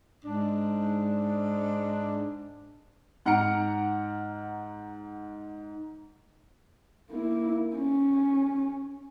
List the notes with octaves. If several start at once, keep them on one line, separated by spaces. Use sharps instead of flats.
G#2 D4
G#2 F#5 A#5 F6 C#7 D7
A#3 E4
C#4